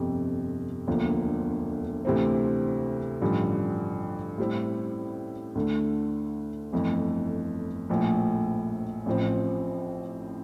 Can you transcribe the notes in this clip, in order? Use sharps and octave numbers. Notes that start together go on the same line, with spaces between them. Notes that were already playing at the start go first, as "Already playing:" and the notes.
Already playing: G1 F2 C3
E1 D2 D3 F3 A#3
D2 C3 E3 A3 C4
A1 G2 D3 F3
A2 G3 C4 E4
D2 D3 A3
G1 F2 E3 A3
A#1 A2 F3 A3
A1 A2 F3 C4